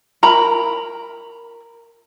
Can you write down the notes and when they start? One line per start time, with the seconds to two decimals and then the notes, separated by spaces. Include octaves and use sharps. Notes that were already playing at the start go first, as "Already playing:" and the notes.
0.23 A#4 A#5 B5